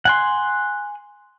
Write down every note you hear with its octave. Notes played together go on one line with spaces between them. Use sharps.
F#5 G#5 C6